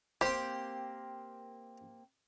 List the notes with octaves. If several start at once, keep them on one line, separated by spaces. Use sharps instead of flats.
A#3 C4 G4 C5 C6